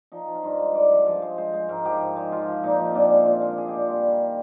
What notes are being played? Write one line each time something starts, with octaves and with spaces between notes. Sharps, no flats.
F3 D#4
F3
F4
G2 D#4
G#3
G2 D5
F3
F3
G#3
G#3 C5
G#3
G#2 A#4
F3 G4
G#2
G#3
F3 F4
F3
A#2 D#4
F3
A#2 C4 D4
G#3
A#2 F4
G#3
G#3 G#4
A#2 G4
F4
G3 G4
D#3
G3